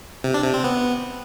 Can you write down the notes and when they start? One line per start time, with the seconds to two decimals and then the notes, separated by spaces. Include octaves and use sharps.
0.24 C3
0.34 D4
0.44 C3
0.54 C4
0.64 B3